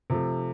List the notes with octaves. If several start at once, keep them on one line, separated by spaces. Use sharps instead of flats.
C3 F3 A3